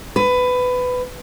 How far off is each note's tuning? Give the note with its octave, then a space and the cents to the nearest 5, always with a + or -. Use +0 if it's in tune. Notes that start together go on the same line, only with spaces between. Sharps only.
B4 +15